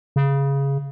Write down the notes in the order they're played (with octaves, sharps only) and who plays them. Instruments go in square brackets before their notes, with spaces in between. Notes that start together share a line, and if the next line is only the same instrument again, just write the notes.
[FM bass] C#3